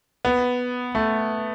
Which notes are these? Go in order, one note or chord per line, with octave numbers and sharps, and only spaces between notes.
B3
A3